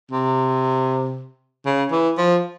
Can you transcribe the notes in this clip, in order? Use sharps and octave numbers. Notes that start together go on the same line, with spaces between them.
C3
C#3
E3
F3